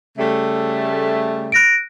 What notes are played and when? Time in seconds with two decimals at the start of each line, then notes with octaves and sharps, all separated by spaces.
0.18 C#3 G3 A3
1.52 F#6 A#6 D7